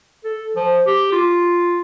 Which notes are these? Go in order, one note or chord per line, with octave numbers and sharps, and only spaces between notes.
A4
F3
G4
F4